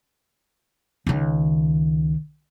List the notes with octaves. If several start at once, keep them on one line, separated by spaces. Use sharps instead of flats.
C#2 D#3